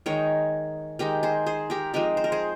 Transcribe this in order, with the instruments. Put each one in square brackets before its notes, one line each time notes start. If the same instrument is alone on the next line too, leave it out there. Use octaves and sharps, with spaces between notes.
[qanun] D#3 G#3 D#4 A#4 C#5
D#3 G#3 D#4 G4 A#4
G#4 C5
G#4 C5
G4 A#4
F3 G#3 C4 D#4 G4 A#4
C5
A#4
G#4 C5